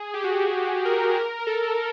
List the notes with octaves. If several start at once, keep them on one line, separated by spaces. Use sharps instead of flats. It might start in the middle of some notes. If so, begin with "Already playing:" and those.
Already playing: G#4
G4
F#4
A#4
A#4
A#4
A4